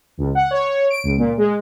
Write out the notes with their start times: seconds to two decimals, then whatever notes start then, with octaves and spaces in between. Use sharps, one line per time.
0.18 C#2
0.35 F#5
0.51 C#5
0.90 D7
1.04 C#2
1.18 A#2
1.38 G#3